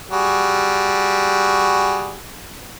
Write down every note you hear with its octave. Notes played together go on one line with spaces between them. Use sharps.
G3 F#4 G#4